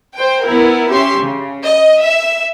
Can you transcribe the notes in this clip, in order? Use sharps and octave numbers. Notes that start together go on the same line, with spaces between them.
C5 G5
B3 E4 A#4
C#4 G4 E5 C6
C#3
D#5
E5